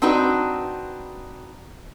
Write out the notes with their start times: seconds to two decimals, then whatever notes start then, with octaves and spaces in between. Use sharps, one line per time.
0.02 C4 D4 D#4 F#4 B4